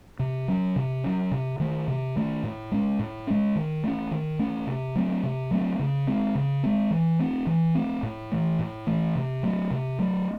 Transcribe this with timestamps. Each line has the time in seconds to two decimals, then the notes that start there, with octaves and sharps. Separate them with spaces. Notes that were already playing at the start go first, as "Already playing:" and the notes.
0.20 C3
0.48 F#3 C#4
0.76 C3
1.04 F#3 C#4
1.31 C3
1.60 D#3 A3
1.88 C3
2.16 D#3 A3
2.43 A2
2.72 G#3 C#4
2.99 A2
3.27 G#3 C#4
3.56 D#3
3.84 A3 C#4
4.11 D#3
4.39 A3 C#4
4.67 C3
4.95 F#3 A3 C4
5.23 C3
5.51 F#3 A3 C4
5.79 C#3
6.07 G#3 C4
6.35 C#3
6.63 G#3 C4
6.91 E3
7.19 A3 C4
7.47 E3
7.75 A3 C4
8.03 A2
8.32 E3 A3
8.59 A2
8.87 E3 A3
9.15 C3
9.43 F#3 A3
9.71 C3
9.99 F#3 A3